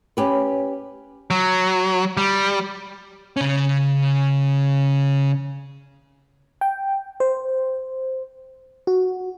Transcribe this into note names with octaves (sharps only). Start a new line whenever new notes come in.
C#4 G4 B4
F#3
G3
C#3 C#4
G5
C5
F#4